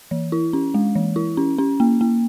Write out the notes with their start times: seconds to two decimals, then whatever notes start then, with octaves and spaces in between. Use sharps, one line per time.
0.11 E3
0.32 E4
0.53 C#4
0.74 G#3
0.95 E3
1.16 E4
1.37 C#4
1.58 C#4
1.80 A#3
2.01 A#3